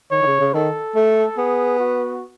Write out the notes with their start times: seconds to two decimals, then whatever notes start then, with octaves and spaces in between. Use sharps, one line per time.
0.11 D#3 C#5
0.22 D#3
0.26 C#3
0.40 C#3
0.54 D#3 A4
0.96 A3
1.38 B3 G#4
1.79 F#4